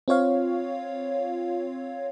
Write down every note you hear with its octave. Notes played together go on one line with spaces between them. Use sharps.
C4 F4 C#5 F5